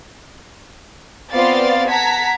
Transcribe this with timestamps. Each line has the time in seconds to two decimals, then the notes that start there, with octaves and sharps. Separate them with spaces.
1.32 B3 C4 F4 D5 F5 A6
1.88 F#5 A5 A#5 G#6 B6